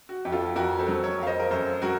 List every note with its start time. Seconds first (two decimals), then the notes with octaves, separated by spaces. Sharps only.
0.09 F#4
0.25 F2
0.32 F4 A4
0.56 F2 F#4 A#4
0.79 A4 C5
0.88 F#3
1.04 A#4 C#5
1.19 F2 F5
1.27 C5 D#5
1.40 A#4
1.51 F#2 A4 C5
1.82 F#3 F#4 A#4